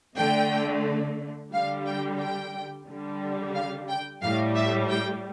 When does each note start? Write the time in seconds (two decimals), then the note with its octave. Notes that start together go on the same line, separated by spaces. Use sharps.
0.17 D3 A3 G5
1.53 D3 G3 F5
1.86 G5
2.20 G5
2.87 D3 G3
3.55 F5
3.88 G5
4.22 A2 G3 F5
4.56 E5
4.90 G5